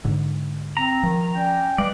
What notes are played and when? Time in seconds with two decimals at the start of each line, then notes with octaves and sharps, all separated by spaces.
0.05 G#2 D3
0.77 C4 A#5
1.03 D#3 F3
1.35 C#4 D5 G5
1.78 G3 B4 D5 D#5 F5